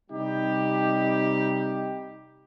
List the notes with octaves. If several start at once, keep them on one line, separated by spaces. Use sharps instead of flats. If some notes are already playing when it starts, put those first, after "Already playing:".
C3 G3 D#4 G4